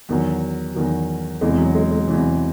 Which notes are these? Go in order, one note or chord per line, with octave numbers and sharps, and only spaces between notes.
E2 D#3 F#3
E2 D#3 F#3
E1 E2 C3 E3 G#3
F#3
G#3
G#3
E1 E2 C3 E3